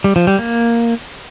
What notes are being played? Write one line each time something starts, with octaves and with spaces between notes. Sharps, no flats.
G3
F3
G3
A#3